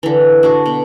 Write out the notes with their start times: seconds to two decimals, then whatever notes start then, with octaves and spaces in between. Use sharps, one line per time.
0.03 D3 E3
0.43 D4 F#4
0.66 B2